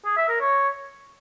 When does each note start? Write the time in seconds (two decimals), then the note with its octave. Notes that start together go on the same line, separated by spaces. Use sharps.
0.05 G#4
0.17 E5
0.29 A#4
0.40 C#5